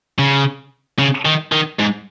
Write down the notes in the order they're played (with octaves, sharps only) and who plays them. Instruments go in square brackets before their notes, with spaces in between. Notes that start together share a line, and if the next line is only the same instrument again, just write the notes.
[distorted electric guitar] C#3
C#3
D#3
D#3
G#2